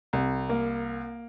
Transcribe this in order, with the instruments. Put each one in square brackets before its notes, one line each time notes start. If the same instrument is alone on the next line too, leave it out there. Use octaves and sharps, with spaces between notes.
[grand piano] C2
A#3